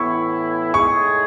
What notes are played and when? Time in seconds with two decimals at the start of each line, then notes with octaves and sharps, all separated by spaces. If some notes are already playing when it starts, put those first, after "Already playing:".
Already playing: A2 E3 B3 E4 C#6
0.73 A2 G#3 D#4 G#4 C#6